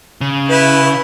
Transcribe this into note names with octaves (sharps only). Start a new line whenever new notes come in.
C#3
E4 B4